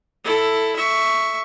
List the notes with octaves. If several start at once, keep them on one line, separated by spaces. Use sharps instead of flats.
E4 A4
E5 C#6